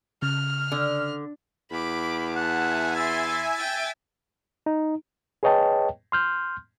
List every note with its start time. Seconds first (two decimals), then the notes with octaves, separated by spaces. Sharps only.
0.22 C#3 F6
0.72 D3
1.71 E2 B5 D6
2.36 E5 F#5 G#5 A5
2.95 E4 C6 A6
3.55 G5 A6
4.66 D#4
5.43 G#4 B4 C#5 D#5 G5 A5
6.12 C6 F6 G6